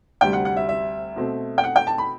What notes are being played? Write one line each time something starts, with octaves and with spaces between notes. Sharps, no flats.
D2 C3 G3 G5
F#5
F#5
E5
E5
B2 A3 C4
G5
F#5
G5
A5
B5